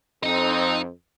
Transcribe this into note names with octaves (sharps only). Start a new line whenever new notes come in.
F2 C4 D#4 D#5